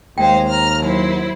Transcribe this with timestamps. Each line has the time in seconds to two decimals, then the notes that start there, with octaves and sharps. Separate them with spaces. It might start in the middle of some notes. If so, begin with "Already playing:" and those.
0.18 D#2 G#3 C5 F5 G5
0.48 A#5 F6
0.81 F#3 E4 C5